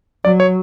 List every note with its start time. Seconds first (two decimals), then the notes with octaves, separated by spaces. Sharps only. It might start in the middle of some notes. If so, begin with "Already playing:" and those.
0.25 F#3 D5
0.40 C#5